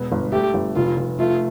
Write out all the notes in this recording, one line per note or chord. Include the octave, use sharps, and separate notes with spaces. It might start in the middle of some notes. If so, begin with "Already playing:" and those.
Already playing: E1 B3
G1
A3 G4
G1
F1 F4
F1
A3 F4